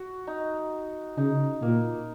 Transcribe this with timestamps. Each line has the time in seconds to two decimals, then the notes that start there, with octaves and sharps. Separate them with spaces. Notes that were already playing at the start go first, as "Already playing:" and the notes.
Already playing: F#4
0.27 D#4
1.18 C#3 D#4
1.62 A#2 A#3